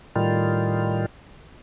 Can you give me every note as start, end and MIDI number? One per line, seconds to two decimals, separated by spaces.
0.16 1.06 45
0.16 1.06 51
0.16 1.06 55
0.16 1.06 65